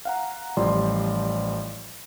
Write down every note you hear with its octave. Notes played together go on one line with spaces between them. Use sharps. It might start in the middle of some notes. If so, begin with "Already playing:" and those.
F5 F#5 A#5
A1 F3 G3 D5 C6